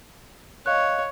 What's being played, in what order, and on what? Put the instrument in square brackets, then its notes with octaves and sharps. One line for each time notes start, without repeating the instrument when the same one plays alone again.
[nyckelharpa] C#5 [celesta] D#5 F5 F#6